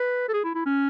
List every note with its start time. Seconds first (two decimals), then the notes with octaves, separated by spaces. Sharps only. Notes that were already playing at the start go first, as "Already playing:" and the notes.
Already playing: B4
0.29 A4
0.33 G#4
0.44 E4
0.55 E4
0.66 C#4